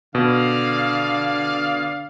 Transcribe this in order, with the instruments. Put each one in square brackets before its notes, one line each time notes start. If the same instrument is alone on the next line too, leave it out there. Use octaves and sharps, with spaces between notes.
[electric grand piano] B2 [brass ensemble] D3 D5 F5